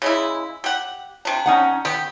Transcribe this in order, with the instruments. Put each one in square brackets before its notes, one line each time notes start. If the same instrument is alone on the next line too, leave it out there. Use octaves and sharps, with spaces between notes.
[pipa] C#3 G#3 E4
G4 F#5
C3 D4
[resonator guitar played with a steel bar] C#4 D#4 F#5
[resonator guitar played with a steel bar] D#3 [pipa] B3 G4